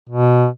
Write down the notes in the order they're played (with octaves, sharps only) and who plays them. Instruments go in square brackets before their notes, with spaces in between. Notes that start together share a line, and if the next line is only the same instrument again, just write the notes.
[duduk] B2